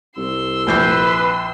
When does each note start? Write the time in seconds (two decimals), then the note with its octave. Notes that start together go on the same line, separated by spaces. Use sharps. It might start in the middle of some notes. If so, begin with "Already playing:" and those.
0.17 C2 C6 E6
0.67 A#1 B4 G6 C7